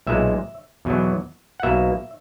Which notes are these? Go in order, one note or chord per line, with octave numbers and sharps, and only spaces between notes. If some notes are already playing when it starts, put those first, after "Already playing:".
B1 A#2 G#3 E5
E2 B2 F#3
F#5
B1 B2 A#3 E5